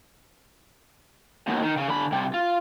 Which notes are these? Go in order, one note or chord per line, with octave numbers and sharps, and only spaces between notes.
D#2 B2
D#3
C#3
D3 B5
C3 G3
F4